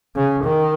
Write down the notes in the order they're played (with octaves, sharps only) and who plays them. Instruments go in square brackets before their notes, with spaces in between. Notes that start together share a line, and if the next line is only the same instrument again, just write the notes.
[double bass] C#3
D#3